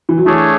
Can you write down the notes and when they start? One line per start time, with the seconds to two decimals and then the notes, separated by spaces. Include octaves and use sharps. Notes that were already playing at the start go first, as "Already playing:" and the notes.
0.09 E3
0.18 F#3
0.26 E3 A3 D4 G#4 C#5